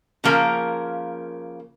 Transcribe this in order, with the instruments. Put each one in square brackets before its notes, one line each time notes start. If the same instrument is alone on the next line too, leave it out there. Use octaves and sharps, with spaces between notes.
[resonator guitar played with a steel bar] C#3 F3 A#3 A#4 F5